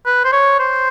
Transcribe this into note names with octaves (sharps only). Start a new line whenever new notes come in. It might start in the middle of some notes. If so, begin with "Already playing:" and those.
B4
C5
C#5
C5